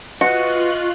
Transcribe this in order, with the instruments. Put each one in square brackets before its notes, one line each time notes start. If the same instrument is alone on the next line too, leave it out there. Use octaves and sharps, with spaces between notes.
[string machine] F4 F#6 [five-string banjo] F#4 [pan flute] B4 [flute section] D#5 C#6